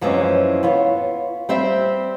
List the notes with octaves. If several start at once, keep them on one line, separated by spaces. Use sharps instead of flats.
F#2 E3 F3 G#3 C4 C#4
B3 F4 C#5
G3 C4 E5